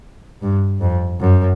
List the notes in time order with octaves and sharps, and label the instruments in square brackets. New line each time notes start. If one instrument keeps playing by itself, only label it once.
[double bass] G2
F2
F#2